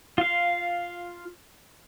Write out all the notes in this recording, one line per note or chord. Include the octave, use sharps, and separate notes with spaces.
F4 F5